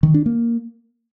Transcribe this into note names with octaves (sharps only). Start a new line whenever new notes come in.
D#3
D4
A#3